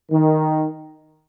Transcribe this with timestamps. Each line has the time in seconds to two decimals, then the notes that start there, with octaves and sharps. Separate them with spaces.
0.11 D#3